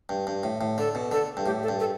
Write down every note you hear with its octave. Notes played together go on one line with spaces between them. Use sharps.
G2
G2
A2
A2
D3 A4
B2
D3 A4
G2
A2 G4
A4
G2
A4